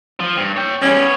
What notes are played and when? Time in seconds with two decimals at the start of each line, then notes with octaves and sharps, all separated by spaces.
0.20 F3
0.37 G2
0.56 C#5 G5
0.82 E2 G3 C#4
0.97 B3 C#5